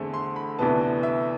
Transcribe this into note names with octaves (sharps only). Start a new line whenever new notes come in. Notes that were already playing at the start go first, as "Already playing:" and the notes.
Already playing: E2 D3 A3 C4
C6
B5
D2 C3 E3 B3 A5
E5